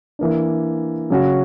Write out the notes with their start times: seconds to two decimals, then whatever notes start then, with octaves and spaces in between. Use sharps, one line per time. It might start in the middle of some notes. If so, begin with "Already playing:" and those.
0.19 E3 A#3 D4
1.10 C#3 F#3 C#4 F#4